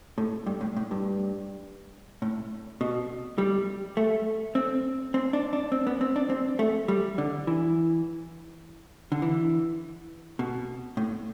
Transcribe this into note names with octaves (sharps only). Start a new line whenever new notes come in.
A2
G2
A2
A2
G2
A2
B2
G3
A3
C4
C4
D4
D4
C4
B3
C4
D4
C4
A3
G3
D3
E3
D3
E3
B2
A2